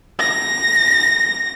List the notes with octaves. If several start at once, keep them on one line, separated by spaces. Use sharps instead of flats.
A#6